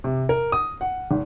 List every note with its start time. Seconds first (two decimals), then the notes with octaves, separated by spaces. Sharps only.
0.04 C3
0.29 A#4
0.52 D#6
0.81 F#5
1.11 G#1